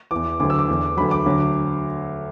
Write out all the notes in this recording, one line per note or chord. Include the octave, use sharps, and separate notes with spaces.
E2 E3 D6
D2 D3 F#3 D6
E6
D6
E2 E3
D2 D3 F#3 B5
D6
D2 D3 F#3